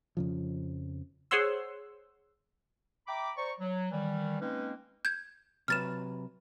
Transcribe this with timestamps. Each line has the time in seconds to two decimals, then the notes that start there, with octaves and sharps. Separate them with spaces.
0.17 F2 C#3 F3
1.31 G#4 C5 C#5 F#5 C6 E6
3.08 E5 G5 A#5 B5 D6
3.37 C5 D5 A#5 C#6
3.60 F#3
3.92 D#3 E3 G3
4.41 G#3 A#3 C4 C#4 D#4 B4
5.05 G6 G#6
5.68 C3 F#3 B4 F6 A6 E7